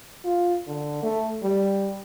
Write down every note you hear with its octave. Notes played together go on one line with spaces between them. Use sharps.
F4
D3
A3
G3